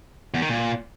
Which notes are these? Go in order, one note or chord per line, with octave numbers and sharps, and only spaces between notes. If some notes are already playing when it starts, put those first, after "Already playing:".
E2
D#3
A#2